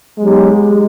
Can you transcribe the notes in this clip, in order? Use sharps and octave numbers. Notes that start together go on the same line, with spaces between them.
F#3 G#3 B3 D#4 G4